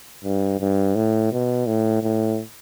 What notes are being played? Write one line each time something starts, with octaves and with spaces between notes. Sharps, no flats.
G2
G2
A2
B2
A2
A2